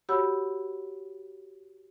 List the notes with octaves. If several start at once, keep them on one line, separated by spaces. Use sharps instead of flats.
F#4 G4 C#5 F#5 B5 E6